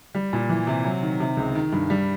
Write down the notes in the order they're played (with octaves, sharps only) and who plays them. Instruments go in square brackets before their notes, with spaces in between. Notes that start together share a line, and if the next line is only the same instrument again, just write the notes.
[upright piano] G3
A#2
E3
C3
F#3
D#3
C3
C#2
D#3
G2
G3